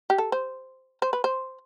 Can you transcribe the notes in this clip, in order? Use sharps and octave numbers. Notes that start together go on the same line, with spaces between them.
G4
A4
C5
C5
B4
C5